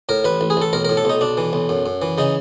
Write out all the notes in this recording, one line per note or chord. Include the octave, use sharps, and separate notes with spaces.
A2 A#4
A1 B4
A1
G#4
A1 A4
B1 A#4
A2 A#4
A4
B1 D#4
B1 D4
E3
B1
F#2
F#2
E3
C#3 D#4